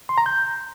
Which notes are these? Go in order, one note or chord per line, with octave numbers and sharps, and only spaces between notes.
C6
A#5
G6